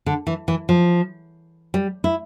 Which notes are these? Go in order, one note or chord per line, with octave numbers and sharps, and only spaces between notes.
D3
E3
E3
F3
G3
E4